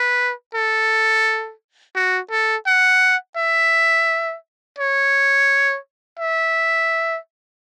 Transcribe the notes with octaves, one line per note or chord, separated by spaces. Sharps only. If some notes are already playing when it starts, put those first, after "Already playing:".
Already playing: B4
A4
F#4
A4
F#5
E5
C#5
E5